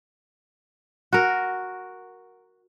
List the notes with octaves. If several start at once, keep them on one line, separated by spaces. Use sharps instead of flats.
F#4 A#4